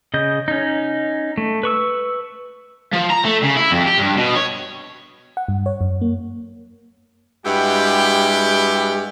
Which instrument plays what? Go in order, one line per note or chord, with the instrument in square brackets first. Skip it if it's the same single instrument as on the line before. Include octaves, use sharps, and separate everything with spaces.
[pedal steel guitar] C#3 D#5 G6
C#4 D#4
A3
B4 C#6 E6
[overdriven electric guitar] F3
A#5
A3
C#3
E4
F2
G4
G2
B2
C#5
[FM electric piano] F#5
G2
C#5
F#2
A#3
[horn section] G2 G#3 E4 F#4 G4